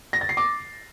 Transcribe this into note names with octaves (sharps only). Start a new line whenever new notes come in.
A#6
A6
C7
D6